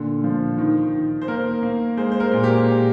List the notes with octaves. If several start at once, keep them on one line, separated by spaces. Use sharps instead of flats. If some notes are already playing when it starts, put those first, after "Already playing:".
Already playing: A#2 D3
F3
D#3
D#3
C5
A#3 A#4
A#3
G#3 C5
C5
A#4
A#2
G4